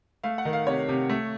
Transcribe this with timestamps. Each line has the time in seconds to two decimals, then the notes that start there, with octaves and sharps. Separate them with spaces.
0.23 A3 F5
0.38 F#5
0.45 D#3
0.53 F5
0.67 C3 C#5
0.88 C3
1.09 A3